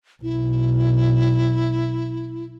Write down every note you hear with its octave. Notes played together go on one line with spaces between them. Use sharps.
B1 E4